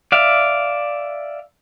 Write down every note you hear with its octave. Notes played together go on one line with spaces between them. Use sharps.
D5 E5 F5